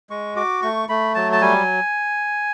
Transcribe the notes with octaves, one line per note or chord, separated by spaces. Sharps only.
G#3 C#6
F#4 D6
A3 C#6
A3 B5
F#3 A5
A5
G3 G#5